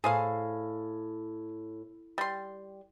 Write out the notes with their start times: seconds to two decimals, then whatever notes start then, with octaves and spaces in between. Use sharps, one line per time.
0.04 A2 G#4 C5 F5
2.18 G3 C6